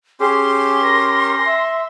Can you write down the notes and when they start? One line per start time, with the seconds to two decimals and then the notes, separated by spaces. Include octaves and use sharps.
0.20 C#4 G4 G#4 C6
0.83 A#4 A#6
1.47 E5